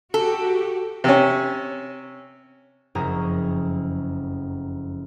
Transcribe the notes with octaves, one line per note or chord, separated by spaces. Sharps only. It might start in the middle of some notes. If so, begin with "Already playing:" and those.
F#4 G4 A4
C3 C#4
F#1 F2 C#4 G#4 A#5 D#6